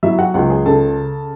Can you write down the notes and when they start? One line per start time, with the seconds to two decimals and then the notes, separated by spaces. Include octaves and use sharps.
0.03 F#3 E4 E5
0.18 F#4 F#5
0.34 C#2 F#4 F#5
0.50 G#4 G#5
0.65 C#3 A4 A5